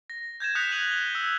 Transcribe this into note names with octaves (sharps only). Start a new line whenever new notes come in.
A#6
G6 G#6 A#6 E7
D#6 F#6 G6 B6 C#7 F7
D#7 F#7
G7
E6